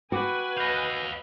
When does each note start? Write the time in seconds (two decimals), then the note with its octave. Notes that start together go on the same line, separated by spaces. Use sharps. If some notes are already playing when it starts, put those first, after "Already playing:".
0.12 F#4 B4 G5 G#5 D6
0.57 D#5 F5 G6 A#6